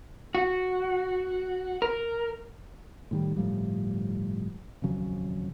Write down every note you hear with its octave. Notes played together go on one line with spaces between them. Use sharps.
F#4
A#4
A2 D#3 G3
G1 A2 F3 G3
D#1 F2 C#3 F#3